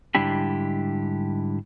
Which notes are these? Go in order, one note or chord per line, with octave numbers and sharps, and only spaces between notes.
G#2 D3 G3 D4 E4 G4